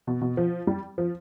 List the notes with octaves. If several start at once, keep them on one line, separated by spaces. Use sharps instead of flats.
B2
B2
F3
G3
F3